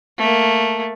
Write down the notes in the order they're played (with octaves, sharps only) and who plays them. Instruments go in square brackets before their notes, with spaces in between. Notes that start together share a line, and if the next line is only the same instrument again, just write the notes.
[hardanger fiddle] A3 A#3